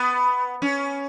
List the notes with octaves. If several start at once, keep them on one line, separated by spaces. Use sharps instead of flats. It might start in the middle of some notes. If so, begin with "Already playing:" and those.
Already playing: B3
C#4